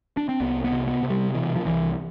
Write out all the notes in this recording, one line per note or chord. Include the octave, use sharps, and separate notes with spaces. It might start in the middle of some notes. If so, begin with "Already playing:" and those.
D4
C4
C2 B3
B3
C3
B3
C3
G3
B2 E3
F3
C2 E3